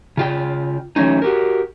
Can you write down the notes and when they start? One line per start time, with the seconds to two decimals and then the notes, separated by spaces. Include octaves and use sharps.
0.17 C#3 F4 G5
0.96 E3 F#3 A3 C#4 D#4
1.22 F#4 G4 A#4